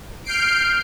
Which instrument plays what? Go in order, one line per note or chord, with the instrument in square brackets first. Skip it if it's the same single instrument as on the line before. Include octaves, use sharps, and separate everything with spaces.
[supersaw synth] F6 G6 C7 D7